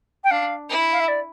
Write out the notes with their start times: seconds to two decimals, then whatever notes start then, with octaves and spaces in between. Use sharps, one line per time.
0.24 G5
0.31 D4 F5
0.69 E4
0.93 F5
1.00 E5
1.08 D5